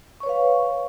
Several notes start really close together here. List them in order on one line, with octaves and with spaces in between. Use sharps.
C#6 C#5 B4 F5